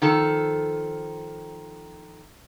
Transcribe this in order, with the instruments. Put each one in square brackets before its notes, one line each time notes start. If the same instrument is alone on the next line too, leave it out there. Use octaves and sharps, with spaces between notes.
[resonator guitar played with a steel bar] D#3 F3 A4